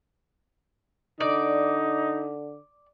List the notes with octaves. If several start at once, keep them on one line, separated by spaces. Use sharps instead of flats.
D3 D#4 D5